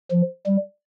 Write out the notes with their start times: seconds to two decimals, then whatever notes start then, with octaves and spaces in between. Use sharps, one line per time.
0.11 F3
0.46 G3